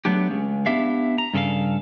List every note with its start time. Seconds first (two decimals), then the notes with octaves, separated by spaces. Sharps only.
0.05 F#3 A3 B3 D4 G4
0.31 C#2 C#3
0.66 B3 D4 E4 G4 E5 F5
1.18 A#5
1.34 G2 C#3 A4 B4 F5